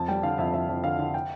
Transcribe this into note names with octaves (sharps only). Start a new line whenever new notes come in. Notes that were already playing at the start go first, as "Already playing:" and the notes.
Already playing: F2 A5
G3 G5
D3 F5
F2 E5
F2 E5
F2
D3 F5
D3
G5